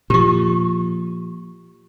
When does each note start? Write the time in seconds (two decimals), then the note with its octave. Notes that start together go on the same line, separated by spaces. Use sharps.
0.10 A#2 F3 G4 C#6